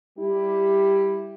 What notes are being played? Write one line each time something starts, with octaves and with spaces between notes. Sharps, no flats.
G3 E4 G4